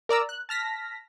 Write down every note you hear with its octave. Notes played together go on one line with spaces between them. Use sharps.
A#4 D5 A#5 E6
F#6
A5 F6 A#6 B6